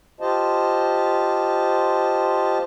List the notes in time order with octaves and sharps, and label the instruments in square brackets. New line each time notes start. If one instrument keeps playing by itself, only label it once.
[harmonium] F4 G4 C5 D#5 A5